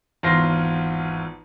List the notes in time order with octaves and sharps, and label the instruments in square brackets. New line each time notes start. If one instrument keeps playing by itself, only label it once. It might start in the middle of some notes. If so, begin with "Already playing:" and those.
[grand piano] G#1 E2 F4 C6 A#6 C7